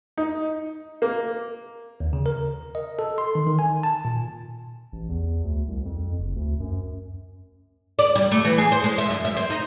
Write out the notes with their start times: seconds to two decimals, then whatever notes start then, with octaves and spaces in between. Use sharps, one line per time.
0.17 D#4
1.02 A#3
2.00 D#2
2.13 C#3
2.26 A#4
2.75 D#5
2.99 A4
3.18 C6
3.35 D#3
3.47 D#3
3.59 G#5
3.83 A5
4.05 A#2
4.93 A1
5.09 E2
5.44 D2
5.68 C2
5.85 F2
6.18 F#1
6.36 D2
6.60 F#2
7.99 D5
8.15 G3
8.31 A3
8.45 E3
8.58 G#4
8.72 C5
8.84 G#3
8.98 E5
9.10 F#2
9.25 E5
9.37 C4
9.50 D#4